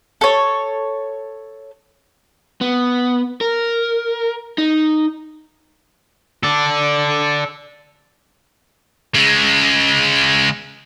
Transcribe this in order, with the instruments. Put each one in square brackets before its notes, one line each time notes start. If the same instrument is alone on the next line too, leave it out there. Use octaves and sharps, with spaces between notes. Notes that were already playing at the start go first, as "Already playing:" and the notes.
[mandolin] A4 C#5
[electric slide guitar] B3
A#4
D#4
[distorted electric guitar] A4 D5
C#3 G#3